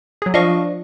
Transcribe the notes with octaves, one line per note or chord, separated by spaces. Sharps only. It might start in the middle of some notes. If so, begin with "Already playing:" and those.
F#3 G#4
F3 D4 D#5 F5 C#6